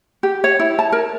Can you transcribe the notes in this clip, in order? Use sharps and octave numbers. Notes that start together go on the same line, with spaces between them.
G4
C#5
E4
A5
A#4